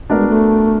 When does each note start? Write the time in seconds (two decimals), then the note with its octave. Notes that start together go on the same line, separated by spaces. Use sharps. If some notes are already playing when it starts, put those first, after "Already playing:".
0.09 A3 B3 D4 F#4 A#4 D5
0.18 G#3
0.28 A3